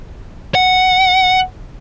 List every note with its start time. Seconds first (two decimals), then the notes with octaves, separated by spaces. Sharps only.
0.55 F#5